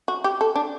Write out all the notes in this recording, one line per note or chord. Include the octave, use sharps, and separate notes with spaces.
F#4
G4
A4
D4